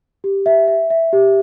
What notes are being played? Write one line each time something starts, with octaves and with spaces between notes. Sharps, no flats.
G4
E5
E5
E5
G4